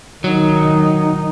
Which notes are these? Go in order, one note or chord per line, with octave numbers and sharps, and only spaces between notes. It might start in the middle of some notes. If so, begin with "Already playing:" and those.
D#3 F#3 D#4